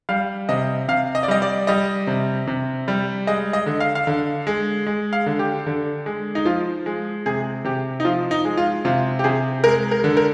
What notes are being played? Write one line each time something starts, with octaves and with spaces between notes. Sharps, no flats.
G3 F5
C3 D#5
C3 F5
D#5
D5
G3 D#5
D5
G3 D#5
C3
C3
G3
G#3 D#5
D#5
D3
F5
F5
D3
G#3
G#3
F5
D3
G4
D3
G#3
D#4
F3 F4
G#3
C3 G#4
C3 G4
D#4
F3 F4
D#4
G#3
F4
C3 F4
G4
C3 G#4
G#3 A#4
A#4
D3
A#4